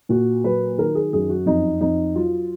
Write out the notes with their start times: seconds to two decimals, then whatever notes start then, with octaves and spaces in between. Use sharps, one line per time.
0.09 A#2 F#4
0.44 F#3 B4
0.78 D#3 A#4
0.95 G#4
1.13 F#2 G#4
1.30 F#4
1.46 F2 D#4
1.81 F2 D#4
2.15 F#3 F4